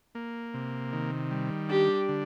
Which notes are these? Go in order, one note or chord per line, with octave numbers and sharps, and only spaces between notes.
A#3
C3
D#3
G3
D4 G4
D3